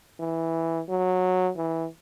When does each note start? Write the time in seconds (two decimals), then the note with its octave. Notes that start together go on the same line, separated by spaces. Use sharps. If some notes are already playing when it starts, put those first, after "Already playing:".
0.20 E3
0.89 F#3
1.57 E3